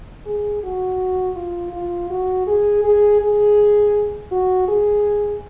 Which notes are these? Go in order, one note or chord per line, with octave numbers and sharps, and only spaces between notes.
G#4
F#4
F4
F4
F#4
G#4
G#4
G#4
F#4
G#4